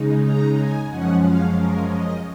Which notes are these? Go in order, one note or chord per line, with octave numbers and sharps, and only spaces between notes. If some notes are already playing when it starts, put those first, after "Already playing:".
Already playing: C#3 G#3 D#4
A#5
G#5
F#2 F3 G#3 C#4 F#5
F5
A#4
D#5